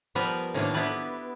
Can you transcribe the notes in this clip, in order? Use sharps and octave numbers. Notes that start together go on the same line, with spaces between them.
F3 G3 B3 A#4 B4
A2 D#3 F3 F#3 A#3 D4
B3 D4 E4 G4 B4 D5